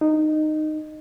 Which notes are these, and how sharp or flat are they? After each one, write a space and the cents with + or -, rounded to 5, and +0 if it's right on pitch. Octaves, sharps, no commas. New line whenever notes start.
D#4 -15